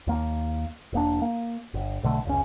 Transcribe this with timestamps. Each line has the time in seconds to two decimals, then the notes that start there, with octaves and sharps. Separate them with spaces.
0.07 D#2 A#3
0.93 E1 A#3 D4
1.22 A#3
1.74 G1
2.03 B1 B2 D3 A3
2.25 F1 C#2 C#4